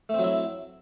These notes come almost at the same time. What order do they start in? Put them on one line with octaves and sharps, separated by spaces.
A3 C4 F#3 E4